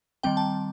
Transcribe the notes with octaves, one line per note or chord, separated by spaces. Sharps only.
D#3 G3 C4 G5
A5